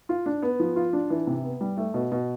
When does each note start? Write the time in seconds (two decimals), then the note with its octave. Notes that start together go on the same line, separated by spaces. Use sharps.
0.09 F4
0.26 D4
0.42 B3
0.60 F3
0.76 F4
0.93 D4
1.10 E3
1.27 C3
1.44 B3
1.61 G3
1.77 A3
1.94 B2
2.12 B2